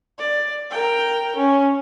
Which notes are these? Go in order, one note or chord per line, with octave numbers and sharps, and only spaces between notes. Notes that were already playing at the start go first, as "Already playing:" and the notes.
D5
A#4 G5
C#4